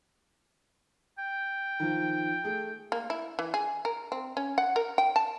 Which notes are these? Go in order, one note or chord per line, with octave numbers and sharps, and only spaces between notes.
G5
D#3 F3
A3 G#4
A#3
E4
E3
G#4
A#4
C4
C#4
F#5
A#4
G5
A5